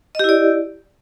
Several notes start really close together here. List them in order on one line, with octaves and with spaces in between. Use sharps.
D#5 G4 E4 D5